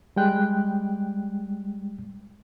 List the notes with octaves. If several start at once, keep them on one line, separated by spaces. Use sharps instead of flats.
G3 G#3 G5 F#6